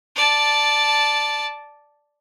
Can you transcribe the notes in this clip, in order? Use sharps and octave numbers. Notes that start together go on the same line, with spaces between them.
D5 A5